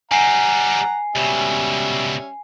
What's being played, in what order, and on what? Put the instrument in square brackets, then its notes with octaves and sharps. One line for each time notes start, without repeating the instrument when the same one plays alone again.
[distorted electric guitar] G3 D#4 [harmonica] F#5 A#5 [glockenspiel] G#5 C7
[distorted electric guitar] C#2 B2 [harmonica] G3 C#4 E5